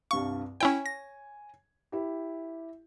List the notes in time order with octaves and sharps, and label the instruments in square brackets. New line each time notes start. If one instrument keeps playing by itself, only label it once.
[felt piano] C2 G2 F5 [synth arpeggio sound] C#6
[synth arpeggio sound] C#4 E4 G5 [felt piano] C#5 G#5
[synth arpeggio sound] A#6
[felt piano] E4 G4